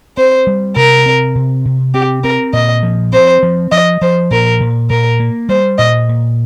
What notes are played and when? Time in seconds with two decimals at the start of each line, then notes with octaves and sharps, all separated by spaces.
0.17 C4 C5
0.47 G3
0.76 C3 A#4
1.06 C4
1.35 C3
1.65 C3
1.94 C4 G4
2.23 C4 A#4
2.53 A#2 D#5
2.83 F3
3.13 C4 C5
3.43 F3
3.72 F3 D#5
4.02 F3 C5
4.31 A#2 A#4
4.60 A#2
4.90 A#2 A#4
5.20 A#3
5.49 G3 C5
5.78 A#2 D#5
6.09 A#2